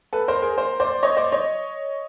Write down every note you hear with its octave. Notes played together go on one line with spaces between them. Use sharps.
A4 B4
A#4 C5
G#4 A#4
A#4 C5
C5 D5
C#5 D#5
C5 D5
C#5 D#5